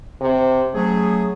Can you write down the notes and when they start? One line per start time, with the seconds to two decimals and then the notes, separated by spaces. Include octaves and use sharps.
0.21 C3
0.74 F#3 A3 C#4 G#4